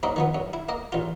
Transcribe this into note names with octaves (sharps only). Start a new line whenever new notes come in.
F#2 A#3 C4 D#4
D#3 F3 B3
F#2
E4
A#3 D#5
A1 F4